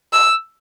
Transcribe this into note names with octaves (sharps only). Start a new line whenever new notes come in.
E6